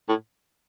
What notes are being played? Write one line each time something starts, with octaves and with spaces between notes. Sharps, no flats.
A2